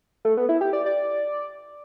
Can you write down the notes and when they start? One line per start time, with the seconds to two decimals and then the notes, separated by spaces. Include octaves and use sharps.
0.25 A3
0.37 B3
0.49 E4
0.61 G4
0.73 D5
0.86 D5